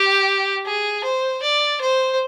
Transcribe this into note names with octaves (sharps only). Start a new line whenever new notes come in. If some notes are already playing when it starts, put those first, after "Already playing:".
Already playing: G4
G#4
C5
D5
C5